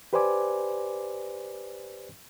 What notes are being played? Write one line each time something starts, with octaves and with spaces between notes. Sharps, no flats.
G4 B4 C5 D5 G#5 D6